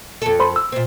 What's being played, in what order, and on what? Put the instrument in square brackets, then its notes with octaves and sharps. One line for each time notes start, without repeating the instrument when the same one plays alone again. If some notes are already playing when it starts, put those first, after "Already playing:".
[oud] F2 A4
[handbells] C5 B5 C6
E6
[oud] A#2 C4